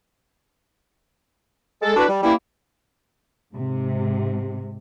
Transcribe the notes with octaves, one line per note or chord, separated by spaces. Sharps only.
G#3 A4
D3 D4 E4 F#4 B4
G3
E3 G3 A#3 C#4 E4
G#2 C3